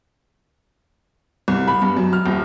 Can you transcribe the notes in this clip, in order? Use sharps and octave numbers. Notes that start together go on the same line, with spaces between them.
C2
B5
G2
F#2
F6
D#1